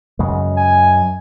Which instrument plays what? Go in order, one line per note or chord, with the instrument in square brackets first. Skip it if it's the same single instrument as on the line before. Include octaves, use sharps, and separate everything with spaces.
[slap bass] F#2 C#3 G#3
[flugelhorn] G#5